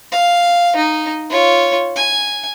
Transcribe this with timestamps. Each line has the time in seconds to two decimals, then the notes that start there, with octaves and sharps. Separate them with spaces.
0.12 F5
0.76 D#4
1.30 F4 C#5
1.96 G#5